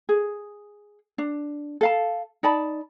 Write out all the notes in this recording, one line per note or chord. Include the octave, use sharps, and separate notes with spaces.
G#4
D4
A4 F5 A5
D#4 D5 A5 B5